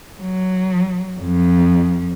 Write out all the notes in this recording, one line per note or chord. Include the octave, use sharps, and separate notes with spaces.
F#3
F2